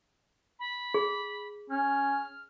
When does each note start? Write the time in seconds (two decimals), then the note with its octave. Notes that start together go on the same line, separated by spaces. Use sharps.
0.59 B5
0.94 G#4
1.70 C#4 F6